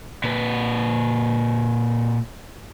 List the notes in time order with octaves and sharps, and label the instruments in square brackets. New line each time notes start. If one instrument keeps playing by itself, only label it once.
[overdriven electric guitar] A#2 B4